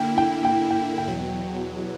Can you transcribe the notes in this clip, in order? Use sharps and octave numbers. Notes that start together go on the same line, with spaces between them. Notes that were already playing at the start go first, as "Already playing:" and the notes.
Already playing: D3 A#3 E4 G5
G5
G5
G5
G5
E2 B2 F#3